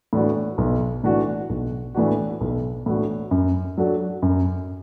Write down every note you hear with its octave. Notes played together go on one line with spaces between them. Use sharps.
A2 E3 D4 F#4
B1
A2 E3 D4 F#4
B1
A2 E3 D4 F#4
B1
A2 E3 D4 F#4
F#2
F#3 D4 F#4 A4
F#2